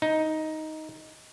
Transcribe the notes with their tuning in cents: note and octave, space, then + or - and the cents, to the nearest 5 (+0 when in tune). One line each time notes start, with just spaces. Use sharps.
D#4 +10